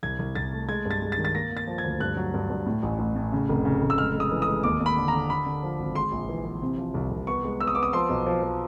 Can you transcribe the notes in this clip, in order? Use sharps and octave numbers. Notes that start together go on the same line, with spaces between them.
C2 G#6
C2
C2 A6
A3
G#3 G#6
G2
A6
G#3
A6
D#3
A6
A#3 A#6
A#3
A6
F3
G#6
D2
G2 F#6
F#3
G2
G2
A2
A1
A1
A2
C#3
F1
C#3
F1
E6
G#3 F6
G#3
D#6
E3
D#6
G#3
D#2 D6
D#2
B5
D3
A#5
D3
D3 B5
D3
F3
G#1
G#3 C6
A#1
E3
E3
C3
F3
C2
C2
B3 C#6
G#3
B3 E6
D#6
B3 D6
D#6
F3 C6
B1
F3
F3